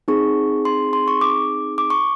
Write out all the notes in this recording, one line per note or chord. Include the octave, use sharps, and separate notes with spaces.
C4 D#4 G#4 C#6
C6
C6
C#6
D6
D6
C#6